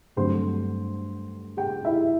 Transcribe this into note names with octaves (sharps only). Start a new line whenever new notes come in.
G2 D3 F#3 A3 C4 C5 C6
G4 G5
E4 E5